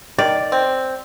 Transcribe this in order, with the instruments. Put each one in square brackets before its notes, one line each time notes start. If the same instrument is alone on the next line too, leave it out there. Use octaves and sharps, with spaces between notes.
[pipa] D#3 [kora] D5
[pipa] C4